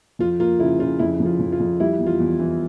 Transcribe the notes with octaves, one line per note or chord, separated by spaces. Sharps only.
F2 F4
A#3 F4
C#3 E4
C#3 F4
F2 E4
F2
F4
F2
F4
F2
G3 E4
E2
F4
E2
E3